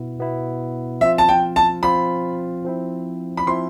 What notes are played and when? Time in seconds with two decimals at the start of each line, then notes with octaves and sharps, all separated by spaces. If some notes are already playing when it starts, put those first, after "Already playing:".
Already playing: B2 B3 E4
0.19 B2 B3 E4
1.01 F3 C4 F4 E5
1.18 A5
1.29 G5
1.56 A5
1.83 F3 C4 F4 B5
2.65 F3 C4 E4
3.37 B5
3.47 F3 C4 E4 C6